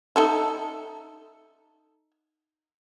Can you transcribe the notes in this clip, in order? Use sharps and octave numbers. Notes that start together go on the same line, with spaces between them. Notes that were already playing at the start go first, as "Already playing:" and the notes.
D#4 A4 E5